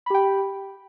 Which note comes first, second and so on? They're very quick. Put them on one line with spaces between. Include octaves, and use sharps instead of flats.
B5 G4 G5